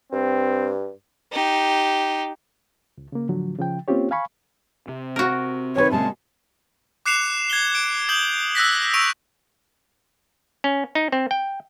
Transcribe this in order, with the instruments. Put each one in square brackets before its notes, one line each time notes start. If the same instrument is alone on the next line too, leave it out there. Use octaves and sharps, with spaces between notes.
[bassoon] G2 [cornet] C4
[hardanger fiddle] D#4 G4
[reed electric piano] C#2
C#3 A#3
A2 D3 F3 F#3
C#3 F3 G5
A#3 C4 C#4 F4 G4 C#5
F5 G#5 B5 C#6
[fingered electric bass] C3
[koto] F#4 A#4
[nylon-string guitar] D#3 A4 B4 [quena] C#5
[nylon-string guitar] A#2 C#3 G#3 [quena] A5
[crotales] D6 F#6 C7 C#7 E7 F7
G#6 C7 G7
D7
D#6 G6 G#6 F#7 G7
E6 F#6 A#6 B6
C#6 E6 D7 F7
[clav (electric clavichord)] C#4
D#4
C4
G5